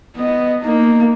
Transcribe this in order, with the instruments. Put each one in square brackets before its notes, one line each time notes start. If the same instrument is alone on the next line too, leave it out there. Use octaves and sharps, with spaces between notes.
[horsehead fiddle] B3 D#5
A#3 D#4